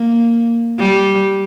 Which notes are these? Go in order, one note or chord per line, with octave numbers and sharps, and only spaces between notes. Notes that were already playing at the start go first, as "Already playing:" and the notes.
Already playing: A#3
G3